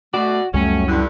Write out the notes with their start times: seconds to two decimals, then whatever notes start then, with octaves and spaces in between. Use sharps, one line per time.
0.14 B2 A3 F#4 D5
0.54 C#2 F#2 G3 A3 C#4
0.88 G2 D3 E4